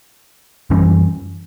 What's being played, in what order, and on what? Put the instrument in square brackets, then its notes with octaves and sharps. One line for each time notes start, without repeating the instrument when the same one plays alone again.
[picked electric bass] F#2 E3 G3 C#4